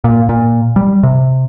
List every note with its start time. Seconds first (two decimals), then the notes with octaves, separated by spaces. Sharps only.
0.04 A#2
0.29 A#2
0.76 G3
1.03 C3